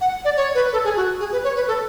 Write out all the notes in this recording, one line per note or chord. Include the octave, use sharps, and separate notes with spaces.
F#5
D5
C#5
B4
A4
G#4
F#4
G#4
B4
C#5
B4
A4